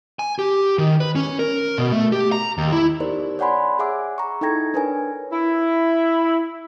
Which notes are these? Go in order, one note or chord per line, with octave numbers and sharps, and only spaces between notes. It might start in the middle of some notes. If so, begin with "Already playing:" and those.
G#5
G4
D#3
B4
C#4
A#4
B2
A3
G4
A#5
D#2
E4
B3 D#4 G4 A#4 C5 D5
C#5 D5 F#5 G#5 B5 C6
G#4 E5 F#5 G#5 D6 E6
A#5 C#6
D#4 E4 A4 G5 G#6 A#6
D4 A#4 B4 C#5 G#5
E4